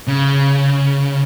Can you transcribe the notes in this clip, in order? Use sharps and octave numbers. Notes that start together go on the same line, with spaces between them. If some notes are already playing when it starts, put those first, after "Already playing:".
C#3